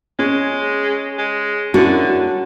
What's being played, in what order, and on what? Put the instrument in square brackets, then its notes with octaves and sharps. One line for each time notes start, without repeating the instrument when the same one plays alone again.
[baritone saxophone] G#3 [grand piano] C#4
[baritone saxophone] G#3
[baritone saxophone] D3 [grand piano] C#4 E4 A#4 [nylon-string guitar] F#4